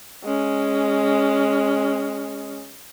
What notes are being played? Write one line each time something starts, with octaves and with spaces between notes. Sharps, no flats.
G#3 C#4